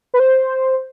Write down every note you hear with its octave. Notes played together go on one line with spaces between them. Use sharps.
B4
C5